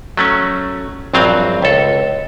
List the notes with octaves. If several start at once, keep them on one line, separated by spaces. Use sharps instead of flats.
F#3 A3 C#4
A#1 G2 F#3 C4 F5
C#2 A4